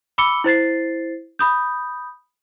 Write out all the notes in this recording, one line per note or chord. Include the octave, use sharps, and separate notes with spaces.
B5 D6 E6 C#7 G7
E4 C5 A6 C7
B5 D#6 G6